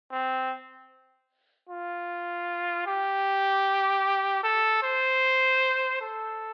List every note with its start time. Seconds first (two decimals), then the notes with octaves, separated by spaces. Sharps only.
0.12 C4
1.69 F4
2.87 G4
4.43 A4
4.83 C5
6.01 A4